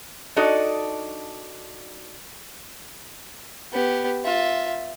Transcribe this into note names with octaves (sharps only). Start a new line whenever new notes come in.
D4 D#4 F#4 A4 D#5
B3 G4
F4 E5